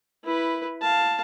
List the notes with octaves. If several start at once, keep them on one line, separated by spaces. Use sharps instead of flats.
E4 B4
F5 A5